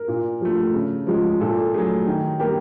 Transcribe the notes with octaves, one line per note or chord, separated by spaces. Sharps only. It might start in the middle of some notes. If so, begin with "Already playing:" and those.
Already playing: A#4
A#2
F3 A3
C#3
F3 G#3
A#2 A4
F#3 A3 G#4
D#3
G3 A#3 G4